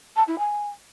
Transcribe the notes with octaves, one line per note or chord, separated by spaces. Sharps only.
A5
E4
G#5